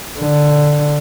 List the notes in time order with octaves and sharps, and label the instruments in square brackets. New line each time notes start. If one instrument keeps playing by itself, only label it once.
[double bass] D3